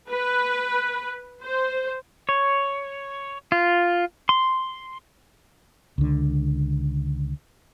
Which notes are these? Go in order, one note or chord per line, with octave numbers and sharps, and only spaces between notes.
B4
C5
C#5
F4
C6
C#2 D3